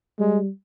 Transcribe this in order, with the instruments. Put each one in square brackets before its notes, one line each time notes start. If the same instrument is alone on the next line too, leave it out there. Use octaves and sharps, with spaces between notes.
[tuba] G3 [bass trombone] G#3